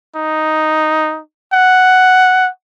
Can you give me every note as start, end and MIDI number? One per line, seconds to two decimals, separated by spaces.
0.16 1.20 63
1.53 2.49 78